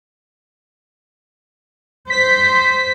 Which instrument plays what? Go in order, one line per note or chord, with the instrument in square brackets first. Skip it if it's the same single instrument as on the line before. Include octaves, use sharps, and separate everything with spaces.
[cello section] C5 [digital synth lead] B6